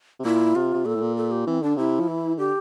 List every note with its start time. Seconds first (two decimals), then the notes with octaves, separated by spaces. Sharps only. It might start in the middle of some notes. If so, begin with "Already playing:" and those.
0.19 C3
0.25 A#2 E4
0.55 C3 F4
0.74 C3
0.85 A#2 A4
0.95 A2
1.01 A#2
1.17 A4
1.31 G4
1.47 E3 C4
1.62 D3 D4
1.77 C3 E4
1.99 F3
2.08 E3
2.38 D3 G4